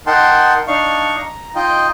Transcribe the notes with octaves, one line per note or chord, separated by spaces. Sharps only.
D#4 A#4 F#5 G5 A5 C6
D4 D#4 F5 C#6
A#5
D#4 F4 D#5 G5